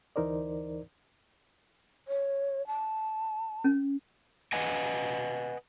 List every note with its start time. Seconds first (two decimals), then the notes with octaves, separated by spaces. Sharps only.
0.16 D2 E3 D#4 A#4 C5 D5
2.08 C#5
2.67 A5
3.64 C#4
4.53 B4 D#5 F#5 G#5